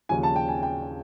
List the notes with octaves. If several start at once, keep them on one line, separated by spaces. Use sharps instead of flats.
D#2 C#3 F3 G#5
A5
G5
G#5
G5